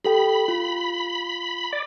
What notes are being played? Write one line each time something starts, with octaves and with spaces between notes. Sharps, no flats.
G4 A4 G5 B5
F4
D5